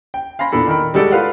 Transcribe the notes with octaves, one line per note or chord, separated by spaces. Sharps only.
G5
F5 G#5 B5 C6 A#6
E2 A#2 D4 A4 B5
D#3 A#4 B5
G3 G#3 F#4 A4 D5
F4 A4 B4 F5 F#5